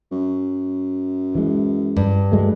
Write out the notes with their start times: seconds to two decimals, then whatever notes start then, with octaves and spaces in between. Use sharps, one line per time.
0.11 F#2
1.35 E3 G#3
1.97 G2
2.32 F#3 G#3 A3